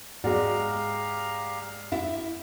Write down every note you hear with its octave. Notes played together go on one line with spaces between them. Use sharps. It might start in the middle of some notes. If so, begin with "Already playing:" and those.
G#2 G#3 F#4 G4 D5 F5 A#5
E4 E5